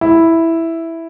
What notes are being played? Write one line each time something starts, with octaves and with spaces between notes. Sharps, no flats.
E4